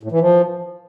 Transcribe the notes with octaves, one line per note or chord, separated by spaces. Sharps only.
A2
E3
F3